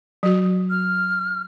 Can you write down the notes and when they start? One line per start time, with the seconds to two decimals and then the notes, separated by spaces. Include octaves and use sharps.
0.23 F#3 F#4
0.70 F6